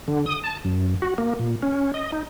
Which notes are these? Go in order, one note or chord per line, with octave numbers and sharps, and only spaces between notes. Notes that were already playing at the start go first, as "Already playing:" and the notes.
D3
D#6
A5
F#2
F#4
A#3
A#2
C#4
D#5
D#4